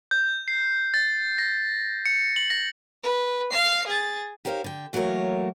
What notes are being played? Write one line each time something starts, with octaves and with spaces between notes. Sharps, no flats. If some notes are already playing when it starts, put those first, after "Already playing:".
G6
C7
A6
A#6
C#7
F#7
A#6
B4
F5 C7
G#4 A6
D#4 G4 A#4 C5 C#5 F5
D3 G5
E3 F#3 A3 A#3 A#4 C#5